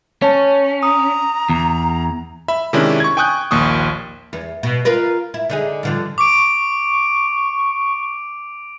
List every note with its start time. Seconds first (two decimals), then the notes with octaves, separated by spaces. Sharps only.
0.22 C#4 C#5 A5
0.83 A#5 D#6
1.49 E2
2.48 E5 B5
2.73 C3 D#3 G#3 C#4 D4 E4
3.00 C#6 G#6
3.17 G5 G#5 C#6 D#6 F#6 G6
3.51 A#1 D#2 C#6 D#6
4.33 E2
4.63 B2
4.85 F4 A#4 B4
5.34 E4
5.50 D3 D#4 G#4
5.83 G2 D3 F3
6.18 C#6 D6 D7